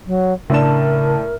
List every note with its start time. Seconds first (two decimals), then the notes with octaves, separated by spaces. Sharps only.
0.06 F#3
0.50 A2 C#3 D4 A#4 A5 E7